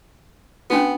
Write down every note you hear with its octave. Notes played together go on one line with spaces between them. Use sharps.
B3 C#4 D4 F#4